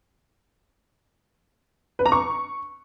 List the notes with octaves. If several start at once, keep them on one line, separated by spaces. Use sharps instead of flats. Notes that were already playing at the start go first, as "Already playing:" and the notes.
B4
A#5
C#6